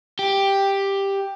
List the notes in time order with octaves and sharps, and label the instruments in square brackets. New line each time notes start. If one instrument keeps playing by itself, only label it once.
[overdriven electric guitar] G4